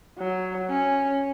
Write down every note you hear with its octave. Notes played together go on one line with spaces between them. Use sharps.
F#3
C#4